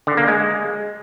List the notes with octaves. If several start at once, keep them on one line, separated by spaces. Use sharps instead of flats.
D3
A#3
G#3